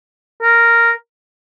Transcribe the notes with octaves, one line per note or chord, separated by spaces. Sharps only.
A#4